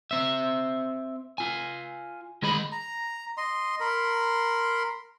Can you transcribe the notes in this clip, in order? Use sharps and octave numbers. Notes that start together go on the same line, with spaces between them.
C4 E5
F4 G#5
D#3 G#3 G#4 D#5 B5
A#5
D#5 C6
A#4 B5 C6